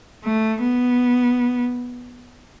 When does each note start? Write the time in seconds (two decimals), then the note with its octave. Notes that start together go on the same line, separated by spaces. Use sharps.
0.25 A3
0.62 B3